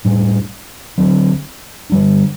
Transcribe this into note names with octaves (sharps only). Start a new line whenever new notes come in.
A2 G3 D4
D3 F#3 C4
D3 G3 D4